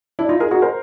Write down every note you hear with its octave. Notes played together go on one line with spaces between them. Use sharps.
D4 E4
D#4 F4
G#4 A#4
F#4 G#4
A#4 C5